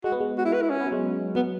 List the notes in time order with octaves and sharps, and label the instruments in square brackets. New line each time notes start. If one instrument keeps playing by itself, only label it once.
[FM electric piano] G#3 [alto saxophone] F#4
[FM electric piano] B3
G#3
[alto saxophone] F#4
E4
B4
E4
C#4
[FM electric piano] B3
F#3
G#3
[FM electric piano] F#3 [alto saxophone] B3